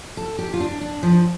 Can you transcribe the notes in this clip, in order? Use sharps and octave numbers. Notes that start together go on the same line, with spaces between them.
A4
G4
F4
D4
D4
F3